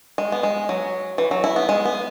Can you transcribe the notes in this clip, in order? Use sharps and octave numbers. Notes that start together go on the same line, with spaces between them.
G#3
B3
G#3
F#3
E3
F#3
E4
B3
G#3
B3